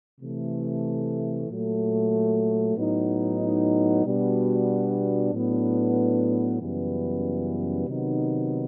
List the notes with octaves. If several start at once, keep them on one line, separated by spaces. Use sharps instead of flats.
C3 E3 A3
A#2 F#3 A3
A2 F#3 B3 D#4
B2 G3 B3 D4 F#4
A2 F#3 B3 D4
F#2 C#3 E3 G3 B3
C3 D#3 F#3 B3 D#4